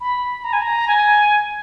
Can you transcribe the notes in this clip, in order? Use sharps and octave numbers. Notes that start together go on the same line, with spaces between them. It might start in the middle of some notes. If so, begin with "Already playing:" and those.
B5
A#5
G#5
A#5
G#5